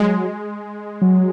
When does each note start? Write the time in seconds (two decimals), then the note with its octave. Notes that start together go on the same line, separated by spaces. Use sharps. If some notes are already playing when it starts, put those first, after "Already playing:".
Already playing: F#3 G#3
1.02 F#3